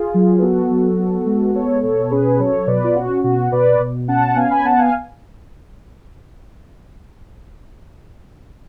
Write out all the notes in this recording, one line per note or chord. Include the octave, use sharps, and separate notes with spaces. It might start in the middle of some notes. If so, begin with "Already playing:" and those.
Already playing: F4 G#4
F#3
B4
B3 F#4 A4
F#3
B3
G#3
B3 A4 C#5
B2 A4 C#5
C#4 G#4 B4
F#3 A4 C#5
B2 B4 D5
F4
C#4 F#4
B2 F#4
B2 B4 D5
B2
C#4 F#5 A5
F#5
B3 F5 G#5
G#5 B5
B3 F#5 A5
F5 G#5